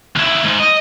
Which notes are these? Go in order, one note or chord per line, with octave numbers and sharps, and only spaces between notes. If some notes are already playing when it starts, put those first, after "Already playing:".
D#2 E4
G#2
D#5